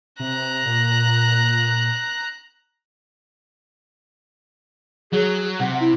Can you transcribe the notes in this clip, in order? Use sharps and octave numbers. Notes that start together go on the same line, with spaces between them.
C3 A#5 F#6
A#2
F#3 G#4
C3 F#5
E4